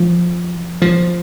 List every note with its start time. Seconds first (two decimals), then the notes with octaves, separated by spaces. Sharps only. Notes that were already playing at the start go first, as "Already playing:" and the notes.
Already playing: F3
0.82 F3